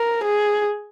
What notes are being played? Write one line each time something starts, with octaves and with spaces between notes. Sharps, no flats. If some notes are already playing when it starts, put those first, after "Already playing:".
Already playing: A#4
G#4